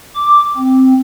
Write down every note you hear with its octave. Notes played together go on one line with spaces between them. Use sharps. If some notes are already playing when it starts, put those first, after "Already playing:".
D6
C4